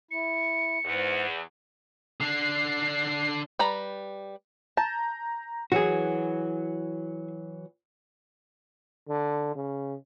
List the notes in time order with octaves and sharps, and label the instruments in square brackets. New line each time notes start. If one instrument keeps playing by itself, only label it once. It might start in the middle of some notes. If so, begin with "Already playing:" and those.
[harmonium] E4 [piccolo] C#7
[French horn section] E2 [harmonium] G#2
[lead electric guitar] D3 D4 [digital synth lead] C7
[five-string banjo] G3 B4 A#5
[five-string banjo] A5 [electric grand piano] A#5 G6
[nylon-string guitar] E3 F#3 [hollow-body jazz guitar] F#4 G#4
[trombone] D3
C#3